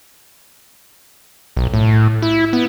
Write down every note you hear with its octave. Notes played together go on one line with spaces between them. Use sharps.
B1
A2
E4
B3